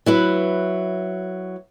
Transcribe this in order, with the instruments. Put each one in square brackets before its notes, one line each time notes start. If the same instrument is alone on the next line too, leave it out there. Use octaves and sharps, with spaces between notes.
[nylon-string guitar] F#3 E4 B4